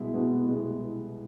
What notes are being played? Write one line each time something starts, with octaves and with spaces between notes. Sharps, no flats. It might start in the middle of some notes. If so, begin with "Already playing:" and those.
Already playing: C2 B2 G#3 B3 E4
C2 B2 G#3 B3 E4
C2 B2 G#3 B3 E4